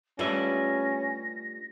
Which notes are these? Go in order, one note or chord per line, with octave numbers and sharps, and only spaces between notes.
G3 A3 C#4 D4 F4 B4 E5 A#6